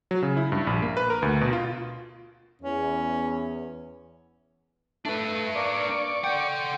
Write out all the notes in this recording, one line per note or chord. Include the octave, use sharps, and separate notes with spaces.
F#3
C#3
E4
G2
A#1
A#3
B4
A#4
D2
B2
F4
E2 C#4
A3 D4 B4
A#3 D5 C#6 D6
A4 F#5 G5